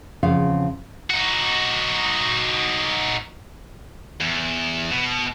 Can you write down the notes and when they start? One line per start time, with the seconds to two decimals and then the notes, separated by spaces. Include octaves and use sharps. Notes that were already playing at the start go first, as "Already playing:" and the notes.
0.23 E2 C#3 F3 C4 F5 F#5
1.10 D#4 F#4
4.21 E2
4.92 B2